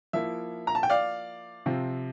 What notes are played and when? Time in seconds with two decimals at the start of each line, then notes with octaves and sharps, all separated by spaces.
0.13 F3 A#3 E4 E5
0.67 A#5
0.75 A5
0.83 G5
0.90 D5 F5
1.66 C3 F3 C4 F4